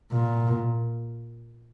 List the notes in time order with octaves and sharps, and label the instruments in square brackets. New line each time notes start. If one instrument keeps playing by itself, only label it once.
[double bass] A#2